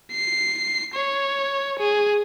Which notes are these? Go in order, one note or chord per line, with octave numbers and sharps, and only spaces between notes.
C7
C#5
G#4